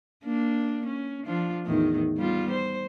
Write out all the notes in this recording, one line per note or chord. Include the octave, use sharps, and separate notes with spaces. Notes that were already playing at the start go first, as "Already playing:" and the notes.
A#3 D4
C#4
F3 D4 F4
E2 A2 D#3
G3 B3 F4
C5